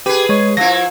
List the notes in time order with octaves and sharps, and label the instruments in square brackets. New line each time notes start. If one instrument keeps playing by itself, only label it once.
[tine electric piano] G4 [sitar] G#4 B4
[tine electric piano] G#3 C#5
[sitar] F3 E4 [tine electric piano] A#6